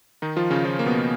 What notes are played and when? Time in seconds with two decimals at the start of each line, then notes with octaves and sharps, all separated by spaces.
0.22 D#3 D#4
0.36 F3 F4
0.50 C#3 C#4
0.65 F3 F4
0.79 A#3
0.86 B2 B3